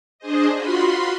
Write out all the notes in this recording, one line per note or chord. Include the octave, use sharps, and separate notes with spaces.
D4 G#4 C5 D#5
F4 F#4 B5 C6